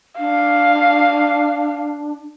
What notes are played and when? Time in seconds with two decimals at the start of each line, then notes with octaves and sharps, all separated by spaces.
0.18 D4 F5